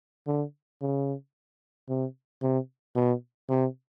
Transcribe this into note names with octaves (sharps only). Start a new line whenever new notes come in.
D3
C#3
C3
C3
B2
C3